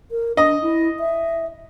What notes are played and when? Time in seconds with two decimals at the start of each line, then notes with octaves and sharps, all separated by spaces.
0.11 A#4
0.37 D4 D#5
0.62 E4
0.99 E5